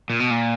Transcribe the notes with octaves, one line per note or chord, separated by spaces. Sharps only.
A#2
B2
A#2